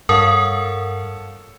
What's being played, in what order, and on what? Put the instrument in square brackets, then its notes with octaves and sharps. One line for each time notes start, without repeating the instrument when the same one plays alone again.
[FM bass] G2 [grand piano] A4 C#5 F5 [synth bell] A#4 F#5 [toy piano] D#6